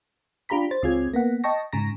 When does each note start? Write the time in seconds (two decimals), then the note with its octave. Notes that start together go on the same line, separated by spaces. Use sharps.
0.49 D4 F4 G4 A#5 B5 B6
0.71 C5 A6
0.83 C#2 C4 F4 G#4 G#6
1.14 A#3 B3 F#5
1.44 D#5 G5 A5 C#6 A#6
1.73 G#2 C#3 A#5 A#6